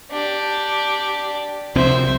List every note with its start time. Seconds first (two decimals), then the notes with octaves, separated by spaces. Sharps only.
0.11 D4 G4
1.75 C2 F3 C4 C5 E5